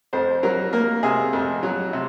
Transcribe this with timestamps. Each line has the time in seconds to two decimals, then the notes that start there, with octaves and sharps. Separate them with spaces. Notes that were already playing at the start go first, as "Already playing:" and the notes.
0.13 F2 C5
0.43 F#3 A#4
0.73 A#3 A#4
1.03 C3 G#4
1.33 F2
1.63 F#3
1.93 C3